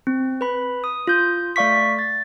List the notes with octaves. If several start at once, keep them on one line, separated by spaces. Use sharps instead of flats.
C4
B4 B5
D#6
F4 G6
A3 D5 F5 C#6 B6
A6